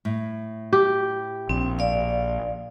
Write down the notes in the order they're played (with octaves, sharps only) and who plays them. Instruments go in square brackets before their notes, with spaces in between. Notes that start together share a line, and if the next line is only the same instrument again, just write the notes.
[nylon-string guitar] A2
[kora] G4
[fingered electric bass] A#1 [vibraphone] C4
[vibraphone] D5 F5